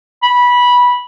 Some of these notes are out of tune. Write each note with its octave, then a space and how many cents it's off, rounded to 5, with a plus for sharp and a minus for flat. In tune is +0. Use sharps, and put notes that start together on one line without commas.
B5 -15